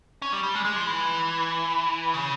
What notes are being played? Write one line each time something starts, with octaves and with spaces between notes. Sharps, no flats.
C#4
G3
G3
G#3
G#3
F3
E3
C#3